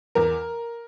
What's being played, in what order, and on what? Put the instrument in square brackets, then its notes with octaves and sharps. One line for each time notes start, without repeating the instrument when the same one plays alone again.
[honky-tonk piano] E2 A#4